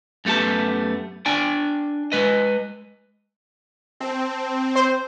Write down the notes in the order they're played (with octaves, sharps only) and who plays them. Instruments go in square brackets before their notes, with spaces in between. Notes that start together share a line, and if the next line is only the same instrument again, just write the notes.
[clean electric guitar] F#2 A3 B3 G4 A5
D4 D5 G5 G#5
G#3 B4 D#5
[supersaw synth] C4 [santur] A5
[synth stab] C5